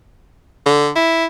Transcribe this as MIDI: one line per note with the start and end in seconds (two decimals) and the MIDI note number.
0.66 0.89 50
0.96 1.25 64